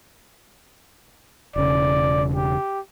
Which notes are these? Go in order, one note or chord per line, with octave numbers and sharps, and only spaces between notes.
E1 C#3 D5
G4